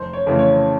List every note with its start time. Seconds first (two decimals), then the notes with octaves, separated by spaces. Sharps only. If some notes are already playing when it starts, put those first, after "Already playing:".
Already playing: F1 C5
0.13 C#5
0.27 F2 C#3 E3 A3
0.39 C#5